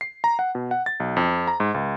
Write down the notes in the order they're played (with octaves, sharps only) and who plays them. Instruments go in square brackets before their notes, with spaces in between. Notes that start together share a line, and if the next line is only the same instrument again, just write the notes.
[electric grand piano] C7
A#5
F#5
B2
F#5
A6
B1
F2
A#5
G#2
C#2